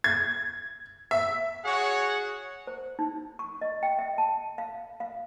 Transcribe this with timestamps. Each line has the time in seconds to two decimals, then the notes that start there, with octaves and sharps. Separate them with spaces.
0.04 G#6
1.11 E5
1.65 F#4 G#4 C#5 F#5
2.67 C5
2.99 D#4
3.39 C#6
3.61 D#5
3.83 G5
3.99 E5
4.18 A5
4.58 F5
5.00 F5